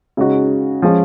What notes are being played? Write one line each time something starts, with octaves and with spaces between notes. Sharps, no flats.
C#3 G#3 D#4 F#4
F3 G#3 C#4